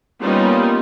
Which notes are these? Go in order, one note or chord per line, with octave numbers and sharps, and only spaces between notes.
G3 A#3 B3 C#4 D#4 F4